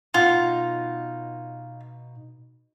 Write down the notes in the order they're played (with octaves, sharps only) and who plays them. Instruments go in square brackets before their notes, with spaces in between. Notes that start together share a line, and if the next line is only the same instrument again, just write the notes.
[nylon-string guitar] B2 D#4 F#5 [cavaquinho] F4